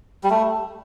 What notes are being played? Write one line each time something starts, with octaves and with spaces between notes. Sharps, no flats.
G3
A3